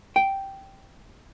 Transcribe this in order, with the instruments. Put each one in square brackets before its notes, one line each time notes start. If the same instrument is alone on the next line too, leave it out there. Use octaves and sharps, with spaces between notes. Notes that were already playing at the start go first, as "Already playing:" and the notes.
[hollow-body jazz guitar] G5